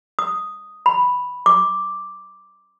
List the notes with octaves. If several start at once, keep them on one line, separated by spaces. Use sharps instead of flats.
D#6
B5
D6